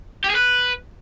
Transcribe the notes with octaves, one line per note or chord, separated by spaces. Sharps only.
G4
G#4
B4